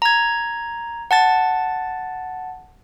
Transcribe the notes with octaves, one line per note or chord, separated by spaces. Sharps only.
A#5 G#6
F#5 A5 A6